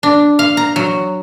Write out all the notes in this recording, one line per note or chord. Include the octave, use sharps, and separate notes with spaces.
D4
F5
A#5
F#3